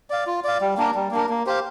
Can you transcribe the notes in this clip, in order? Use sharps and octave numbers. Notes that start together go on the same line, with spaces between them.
D5 F5
F4
D5 F5
G3
A#3 D4 A#4
G3
A#3 D4 A#4
A#3
G4 C5 F5